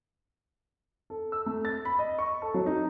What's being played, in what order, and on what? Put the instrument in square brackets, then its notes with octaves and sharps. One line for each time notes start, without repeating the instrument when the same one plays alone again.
[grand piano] A4
E6
A3
A6
B5
D#5
C#6
A4
F#3
D#4